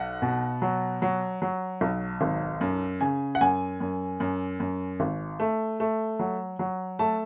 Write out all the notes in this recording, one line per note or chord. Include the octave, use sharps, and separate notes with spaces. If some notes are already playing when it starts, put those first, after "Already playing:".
Already playing: B1 F#5
B2
F#3
F#3
F#3
B1
G#1
F#2
C#3 G#5
F#5
F#2 G#5
F#2
F#2
F#2
G#1
A3
A3
F#3
F#3
A3 A5